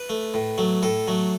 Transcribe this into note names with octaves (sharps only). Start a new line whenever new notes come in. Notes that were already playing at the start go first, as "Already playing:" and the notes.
Already playing: B4
A3
A2
F#3 A3
A2 A4
F#3 A3